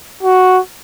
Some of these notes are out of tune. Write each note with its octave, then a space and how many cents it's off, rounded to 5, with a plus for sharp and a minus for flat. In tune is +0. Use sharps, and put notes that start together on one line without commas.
F#4 +0